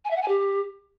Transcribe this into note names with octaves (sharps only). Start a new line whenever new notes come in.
G#5
E5
F#5
G#5
G4